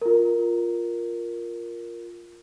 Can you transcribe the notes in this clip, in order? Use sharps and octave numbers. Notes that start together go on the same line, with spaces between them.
F4 A#4